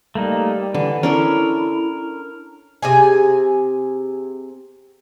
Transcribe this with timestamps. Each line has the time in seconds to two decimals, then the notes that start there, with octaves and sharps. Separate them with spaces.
0.15 G3 A3 A#3 D#4
0.74 D3 E3
1.03 C#4 D4 E4 A4 A#4
2.82 C3 G#4 G#5